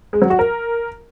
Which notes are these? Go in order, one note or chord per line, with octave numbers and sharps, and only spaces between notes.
G#3
F#3
F#4
A#4